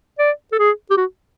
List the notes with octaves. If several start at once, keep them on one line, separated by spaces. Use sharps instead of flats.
D5
A4
G#4
G4
F#4